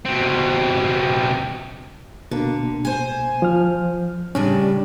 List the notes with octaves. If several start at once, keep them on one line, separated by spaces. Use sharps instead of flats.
B2 C4
B2 D3 A#3
C5 G#5
F3 F6
A2 C#3 G3 C#4 D4